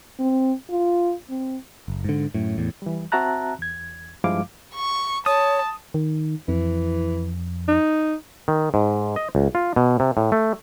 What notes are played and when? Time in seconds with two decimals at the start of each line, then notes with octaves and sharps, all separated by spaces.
0.20 C4
0.70 F4
1.30 C4
1.88 F#1
2.04 G#2 D3
2.34 F#2 A2
2.58 E2 A2
2.82 E3 G3
3.12 C4 F#4 E5 A5 A#5 F#6
3.59 E2 G#6
4.24 G2 F3 G#3 E4 F5 D6
4.75 C#6
5.26 C#5 A5 D#6
5.94 D#3
6.48 F2 E3
7.68 D#4
8.48 D#3
8.74 G#2
9.16 D#5
9.35 C#2
9.55 F4
9.76 B2
10.00 C3
10.17 A2
10.32 A3